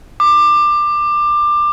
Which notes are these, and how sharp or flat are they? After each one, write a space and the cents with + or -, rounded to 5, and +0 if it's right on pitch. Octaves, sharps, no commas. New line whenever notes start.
D6 +20